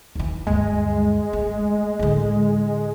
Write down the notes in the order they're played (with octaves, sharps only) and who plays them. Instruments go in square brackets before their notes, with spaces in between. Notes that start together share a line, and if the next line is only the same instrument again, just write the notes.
[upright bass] D#2 E3
[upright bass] D2 G2 [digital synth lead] G#3
[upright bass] A3
A2 D3